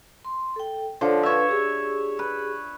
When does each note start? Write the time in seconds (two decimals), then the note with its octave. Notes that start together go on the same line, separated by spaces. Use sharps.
0.25 C6
0.56 A4 G5
1.01 D3 F3 C5 C#5
1.23 D4 B4 C#5 E5 F5
1.48 G4 G#4
2.19 B4